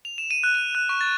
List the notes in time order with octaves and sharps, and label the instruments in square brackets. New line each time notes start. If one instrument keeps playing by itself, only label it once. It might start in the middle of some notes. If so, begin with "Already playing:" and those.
[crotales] F7
E7
D#7
F#6
D#7
F#6
C#6
A6